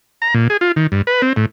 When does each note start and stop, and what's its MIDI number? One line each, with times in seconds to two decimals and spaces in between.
0.22 0.34 82
0.34 0.48 46
0.50 0.57 68
0.61 0.72 65
0.76 0.87 51
0.92 1.02 43
1.07 1.22 71
1.22 1.33 60
1.36 1.46 45